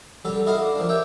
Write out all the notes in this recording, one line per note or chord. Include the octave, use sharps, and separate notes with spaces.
F#3 G3 C#4 A4
E4 F#4 A4 D#5 F5 F#5
D4
F3 A#3 D4
G4 C#5 E5 G5